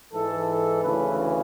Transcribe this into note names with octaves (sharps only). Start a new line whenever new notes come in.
G#2 E3 A4
A4
D2 C#3 E3 B4